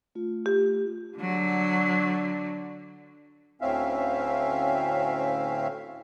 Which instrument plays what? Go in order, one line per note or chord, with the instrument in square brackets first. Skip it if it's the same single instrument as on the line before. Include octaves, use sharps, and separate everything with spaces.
[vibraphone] A3 F4
[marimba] G4
[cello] D3 F#3
[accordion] D2 A2 C4 C#4 E5 F5